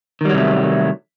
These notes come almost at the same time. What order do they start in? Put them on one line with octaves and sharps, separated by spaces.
D#3 G3 F#3 C3 A3